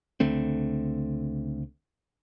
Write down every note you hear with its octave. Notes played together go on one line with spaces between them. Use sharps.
C#2 D3 A3 C4